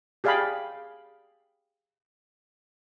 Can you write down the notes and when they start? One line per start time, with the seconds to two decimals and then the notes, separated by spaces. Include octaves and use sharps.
0.24 G4 G#4 D5 F5 G5 B5